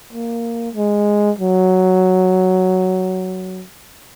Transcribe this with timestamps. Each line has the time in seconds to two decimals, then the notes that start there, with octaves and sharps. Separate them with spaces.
0.13 A#3
0.75 G#3
1.39 F#3